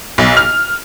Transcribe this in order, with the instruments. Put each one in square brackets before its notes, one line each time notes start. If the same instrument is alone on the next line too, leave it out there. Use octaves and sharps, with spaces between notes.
[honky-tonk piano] B1
F6